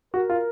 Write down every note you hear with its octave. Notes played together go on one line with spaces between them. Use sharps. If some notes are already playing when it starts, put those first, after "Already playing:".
F#4 A#4
F4